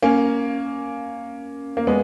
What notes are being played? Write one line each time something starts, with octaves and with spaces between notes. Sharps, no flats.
A#3 C#4
A#3
G#3 B3